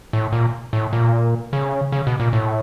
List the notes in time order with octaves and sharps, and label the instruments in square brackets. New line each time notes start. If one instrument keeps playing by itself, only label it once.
[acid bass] A2
A#2
A2
A#2
C#3
C#3
B2
A#2
A2